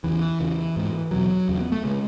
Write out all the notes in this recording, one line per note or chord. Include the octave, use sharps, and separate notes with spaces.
E2 C#3 E3
E2 C#3
G#2
E2 B2 F#3
E2 C#3
B3
A3
C#3 G#3